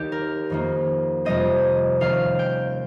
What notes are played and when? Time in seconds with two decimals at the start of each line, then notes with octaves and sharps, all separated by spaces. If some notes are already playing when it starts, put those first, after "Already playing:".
Already playing: D#2 D#3 G4
0.12 A#4
0.50 F2 D#3 A#3
1.25 F2 C3 G3 C4 D#5
2.00 D#2 D#3 A#3 C#4 F5
2.39 G5